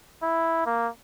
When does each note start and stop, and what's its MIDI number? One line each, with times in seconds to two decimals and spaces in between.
0.23 0.63 64
0.66 0.88 58